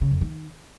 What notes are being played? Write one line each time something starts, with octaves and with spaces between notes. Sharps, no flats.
C#3
F2
D#3